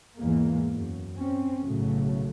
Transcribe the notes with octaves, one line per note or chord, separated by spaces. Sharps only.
E2 G#2 E3 G#3 A#3
F#2
C4 C#4
B1 A2 C#3 F#3 A3